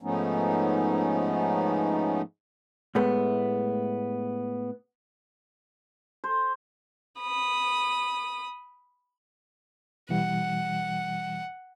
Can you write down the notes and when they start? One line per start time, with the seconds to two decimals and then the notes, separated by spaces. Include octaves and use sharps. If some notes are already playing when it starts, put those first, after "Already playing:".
0.02 G#2 F3 A3 B3 C#4 D#4
2.95 A2 G#3 A3 B3
6.24 C5
7.20 B5 D#6
10.09 B2 E3 G3 F#5